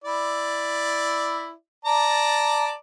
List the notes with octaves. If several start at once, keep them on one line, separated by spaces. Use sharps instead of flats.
E4 D5
D5 A5 A#5